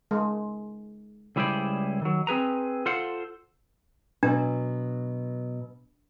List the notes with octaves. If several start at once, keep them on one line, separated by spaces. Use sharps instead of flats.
G#3
C#2 G3 E4 G#4 C5 D5
D#3 F#3
C4 G#4 B4 A#5
F4 A4 C5 F#5
B2 F#3 D4